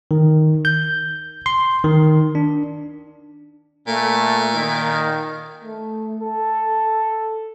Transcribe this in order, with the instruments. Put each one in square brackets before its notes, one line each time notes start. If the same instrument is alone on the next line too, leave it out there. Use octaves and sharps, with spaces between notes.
[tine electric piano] D#3
G6
C6
D#3
D4
[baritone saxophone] A#2 [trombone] A3
[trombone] D#3
A3
A4